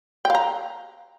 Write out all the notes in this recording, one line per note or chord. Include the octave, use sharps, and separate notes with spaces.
F5 G5 A#5